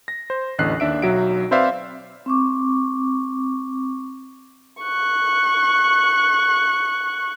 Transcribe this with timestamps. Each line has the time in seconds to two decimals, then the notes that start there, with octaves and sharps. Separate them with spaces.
0.08 A#6
0.30 C5
0.58 A1 E2 D3 D#5 F#6 C7
0.80 D#2 D4 E5 D7
1.02 B1 F#3 F#4 E5 D7
1.51 C4 B4 C5 D5 E5 F5
2.26 C4 C#6 D6
4.83 C#6 F#6